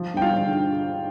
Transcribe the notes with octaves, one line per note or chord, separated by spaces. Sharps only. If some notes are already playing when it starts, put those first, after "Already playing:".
Already playing: F3
G2 G5
F4 F5
D3